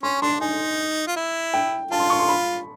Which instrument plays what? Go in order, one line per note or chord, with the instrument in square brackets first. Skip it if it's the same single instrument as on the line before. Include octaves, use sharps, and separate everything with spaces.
[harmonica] C#4 [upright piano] C6
[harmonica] D4 [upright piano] C6
[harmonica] D#4 [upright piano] G#5
[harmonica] F4
E4
[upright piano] G5
[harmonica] F4 [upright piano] A5
[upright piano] C6
C#6
C6
B5